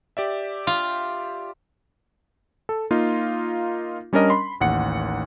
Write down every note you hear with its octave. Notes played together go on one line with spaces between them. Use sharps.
G4 D5 E5
F4
A4
A#3 D#4 F4
G3 C#4 D4 A#4 D#5
B5 C6
A1 D#2 F#5 C#7